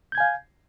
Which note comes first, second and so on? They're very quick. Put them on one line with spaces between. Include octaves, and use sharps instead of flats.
G6 G#6 G#5 F5